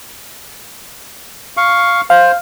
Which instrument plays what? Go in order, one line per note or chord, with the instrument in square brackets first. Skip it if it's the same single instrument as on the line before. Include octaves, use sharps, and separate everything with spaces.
[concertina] F5 C#6
[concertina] C5 [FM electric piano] F5